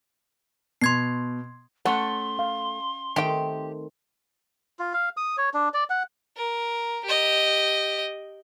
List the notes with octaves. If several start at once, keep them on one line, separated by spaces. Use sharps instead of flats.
B2 C6 G#6 C7
A3 C#4 F#5 C6
F5
D#3 A3 C4 G4 G5
F4
F5
D#6
C#5
D4
D5
F#5
A#4
G4 D#5